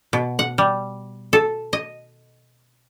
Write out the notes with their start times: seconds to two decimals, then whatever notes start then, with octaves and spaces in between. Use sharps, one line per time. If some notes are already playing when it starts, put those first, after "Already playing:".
0.13 B2
0.39 F#5
0.58 G3
1.33 A4
1.73 D#5